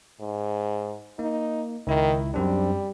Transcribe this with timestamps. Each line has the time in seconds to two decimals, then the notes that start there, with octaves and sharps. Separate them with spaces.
0.20 G#2
1.19 A#3 D#4
1.87 C#2 D#3 E4
2.34 F#2 G3 C4 D4